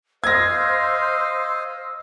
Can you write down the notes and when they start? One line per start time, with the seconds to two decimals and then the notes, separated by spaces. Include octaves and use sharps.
0.24 C5 D#5 F5 E6 G#6 A#6